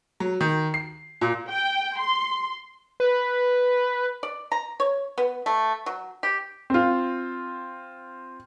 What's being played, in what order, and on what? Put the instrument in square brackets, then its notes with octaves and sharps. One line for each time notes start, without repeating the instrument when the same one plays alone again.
[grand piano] F#3
D#3
C7
A#2
[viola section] G5
C6
[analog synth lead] B4
[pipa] D5
A#5
C#5
B3
A3
F#3
G4
[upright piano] C4 F4